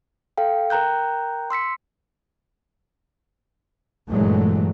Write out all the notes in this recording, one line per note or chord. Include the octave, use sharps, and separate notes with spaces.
A4 F5 G5
A#4 G5 A#5 F#6 G6
C6 E6 B6 C#7
G2 A#2 E3 F#3 G#3 A3